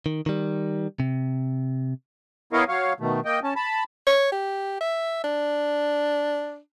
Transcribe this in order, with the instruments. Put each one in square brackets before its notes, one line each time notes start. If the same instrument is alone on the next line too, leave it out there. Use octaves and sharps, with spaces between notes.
[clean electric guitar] D#3
D#3 G3
C3
[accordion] B3 E4 A#4 C#5 D#5 F5
F#3 C#5 F5
B2 D#3 A3
A#3 D#5 G5
C#4 A5
A5 B5
[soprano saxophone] C#5
G4
E5
D4